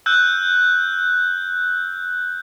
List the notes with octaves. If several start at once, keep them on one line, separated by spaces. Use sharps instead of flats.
E6 F#6 G6